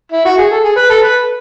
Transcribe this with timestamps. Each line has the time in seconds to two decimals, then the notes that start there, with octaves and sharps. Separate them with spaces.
0.12 E4
0.25 F#4
0.37 G#4
0.51 A4
0.64 G#4
0.76 B4
0.89 A4
1.02 B4